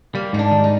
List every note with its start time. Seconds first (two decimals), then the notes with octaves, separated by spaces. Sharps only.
0.15 G3 A#3
0.33 G#2 D#4
0.39 D4
0.51 D#3
0.64 D#4